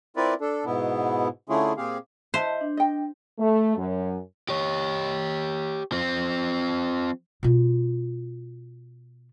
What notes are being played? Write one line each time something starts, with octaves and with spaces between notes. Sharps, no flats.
C4 E4 F4 A#4 B4 D5
D4 A4
G#2 B2 B3 E4
D3 A3 C#4 E4 F4 G#4
A#2 C4 G4 G#4 F5
E4 B4 C5 D#5 E5 A5
D#5
D4
D#5 G5
A3
F#2
G4 C#5
F3 C4
B2 F4